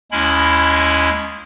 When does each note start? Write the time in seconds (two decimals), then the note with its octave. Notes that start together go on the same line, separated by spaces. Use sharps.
0.12 D#2 G#3 C#4 E4 B5